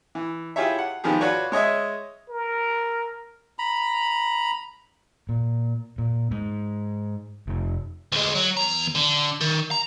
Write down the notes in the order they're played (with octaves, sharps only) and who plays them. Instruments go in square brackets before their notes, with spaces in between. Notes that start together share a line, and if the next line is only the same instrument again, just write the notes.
[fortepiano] E3
E4 F4 G4 G#4 C#5 E5
F#5
G#2 D#3 F3 B3 G4 G#4
F4 F#4 B4 C#5 D5
G#3 C#5 D#5 E5
[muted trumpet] A#4
[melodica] A#5 B5
[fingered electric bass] A#2
A#2
G#2
F1
[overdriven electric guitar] D2 G#3
F#3
E2 A#5
D3
D#3
A#5